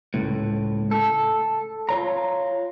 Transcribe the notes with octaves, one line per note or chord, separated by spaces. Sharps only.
C#2 A2
A4
F4 C#5 A#5